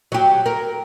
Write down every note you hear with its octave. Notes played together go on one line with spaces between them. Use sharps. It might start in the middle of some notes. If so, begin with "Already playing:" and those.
F#3 G4
A#4